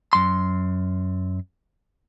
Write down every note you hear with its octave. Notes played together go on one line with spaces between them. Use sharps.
F#2 C6